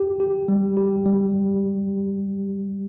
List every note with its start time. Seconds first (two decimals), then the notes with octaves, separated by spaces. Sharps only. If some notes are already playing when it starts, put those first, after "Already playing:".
Already playing: G4
0.20 G4
0.48 G3
0.77 G4
1.06 G3